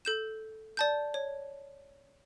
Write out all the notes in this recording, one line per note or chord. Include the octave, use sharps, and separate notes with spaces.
A4 G6 E7
D5 A5 G6
C#5